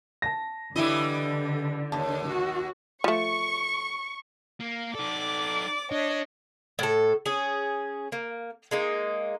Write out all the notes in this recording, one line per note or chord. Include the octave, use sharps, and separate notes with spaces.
A5 A#6
D3 E3 G3 E4 D#5
D#2 A5
F#4
F3 A3 C#6
A#3
D#4 A4 D5 D6
D4 C#5 D#5
A2 A4
C#4 G#4
A#3
G#3 A#3 D#4